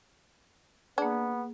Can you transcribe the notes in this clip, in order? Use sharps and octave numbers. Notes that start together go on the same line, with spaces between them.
A#3 B3 D4 G#4